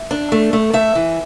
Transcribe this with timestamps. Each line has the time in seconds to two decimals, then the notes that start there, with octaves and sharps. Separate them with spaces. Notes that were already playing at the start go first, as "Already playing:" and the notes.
Already playing: E5
0.11 D4
0.32 A3
0.53 A3
0.73 A3 E5
0.95 E3